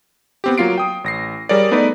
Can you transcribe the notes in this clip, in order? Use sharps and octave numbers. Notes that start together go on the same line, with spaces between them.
B3 C4 G4
F#3 A#3 F4 C7 D7
G5 D#6
A1 A#6 C7
G3 G#4 A#4 C#5 D5
A3 B3 D#4 B4 D5